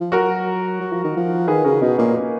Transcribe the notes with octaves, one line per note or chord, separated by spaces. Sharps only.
F3
F#3 F#4 A#4
F#3
F3
D#3
F3
D#3 G#4 B4
C#3 F#4 A#4
B2 B3 D#4
A#2 A#3 C#4
A#3 C#4